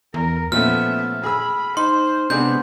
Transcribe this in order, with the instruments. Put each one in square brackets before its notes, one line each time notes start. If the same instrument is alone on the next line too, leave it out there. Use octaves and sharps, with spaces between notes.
[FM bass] E2 [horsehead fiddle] A#4
[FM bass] A#2 [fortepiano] F3 A3 C#4 [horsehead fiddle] B3 E5 [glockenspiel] F6
[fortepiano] G#4 E6 [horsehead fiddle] B5
[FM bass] D#4 [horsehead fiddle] C5 [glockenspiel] C6
[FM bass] C3 [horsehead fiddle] G#3 B3 [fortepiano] C4 D4 G#4 [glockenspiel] G6